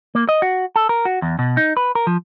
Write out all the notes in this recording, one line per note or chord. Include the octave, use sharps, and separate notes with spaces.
A#3
D#5
F#4
A4
A#4
F#4
E2
B2
D#4
B4
A#4
F3